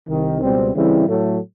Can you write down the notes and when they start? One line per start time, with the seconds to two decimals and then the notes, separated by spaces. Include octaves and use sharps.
0.09 C2 C3 D#3
0.41 C#2 B2 G3 C4
0.74 C#3 E3 G3 C4 E4
1.06 A2 F#3 A3